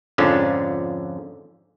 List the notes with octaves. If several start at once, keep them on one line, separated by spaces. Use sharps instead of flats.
F2 G#2 D3 F3 C#4 D4